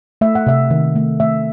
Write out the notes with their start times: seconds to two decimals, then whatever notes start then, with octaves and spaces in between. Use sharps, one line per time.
0.21 A3 E5
0.35 F#5
0.47 C3 E5
0.71 D#3
0.96 A3
1.20 A3 E5